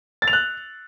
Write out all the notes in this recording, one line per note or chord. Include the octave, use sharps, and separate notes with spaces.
A6
F7
F#6